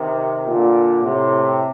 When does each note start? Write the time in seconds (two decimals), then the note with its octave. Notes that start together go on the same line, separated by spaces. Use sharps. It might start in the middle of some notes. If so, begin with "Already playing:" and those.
Already playing: C3 D#3
0.46 A#2 D3
1.02 A2 C3